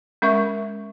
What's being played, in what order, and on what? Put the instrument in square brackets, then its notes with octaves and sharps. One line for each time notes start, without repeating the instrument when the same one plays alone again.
[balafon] G#3 C#4 A#4 E5 C#6